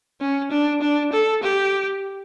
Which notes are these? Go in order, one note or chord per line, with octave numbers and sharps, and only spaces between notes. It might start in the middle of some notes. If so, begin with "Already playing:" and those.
C#4
D4
D4
A4
G4